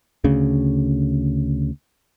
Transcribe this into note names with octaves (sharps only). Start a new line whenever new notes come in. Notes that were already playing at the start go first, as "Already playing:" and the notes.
D2 C#3